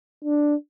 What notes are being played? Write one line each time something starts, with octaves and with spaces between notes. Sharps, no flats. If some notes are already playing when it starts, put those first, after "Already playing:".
D4